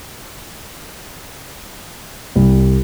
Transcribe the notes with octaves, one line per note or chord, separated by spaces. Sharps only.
C2